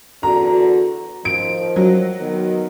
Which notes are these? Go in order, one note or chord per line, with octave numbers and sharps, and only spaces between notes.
E2 D3 F#4 A#5
D#3 F3 D7
F#3
D#3 B3